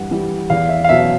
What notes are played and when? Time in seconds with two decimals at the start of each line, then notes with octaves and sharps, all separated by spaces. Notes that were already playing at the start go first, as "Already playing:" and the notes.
Already playing: G2 E3 G3 F#5
0.11 E3 G3
0.50 E2 F5
0.69 E5
0.84 F5
0.89 B2 F#3 E5